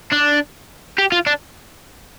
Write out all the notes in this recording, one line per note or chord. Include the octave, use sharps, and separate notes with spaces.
D4
G4
F4
D4